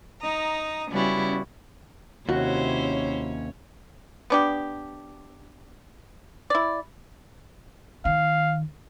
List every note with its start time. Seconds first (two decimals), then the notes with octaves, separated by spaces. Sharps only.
0.19 D#4 A#5 D#6
0.90 C#3 G3 B3 C#4 E4 F#4
2.29 D#2 C3 C#4 E4 F#4 C5 C#5
4.30 B3 D4 G4
6.50 E4 D5
8.05 D#3 F5